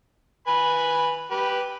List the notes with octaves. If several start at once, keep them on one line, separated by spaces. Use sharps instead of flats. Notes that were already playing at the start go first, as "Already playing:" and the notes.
B4 G#5 B5
G4 B4